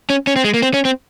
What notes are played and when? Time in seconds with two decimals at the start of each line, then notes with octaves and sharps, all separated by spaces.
0.10 C#4
0.27 C#4
0.36 C4
0.44 G#3
0.54 A#3
0.62 C4
0.74 C#4
0.85 C4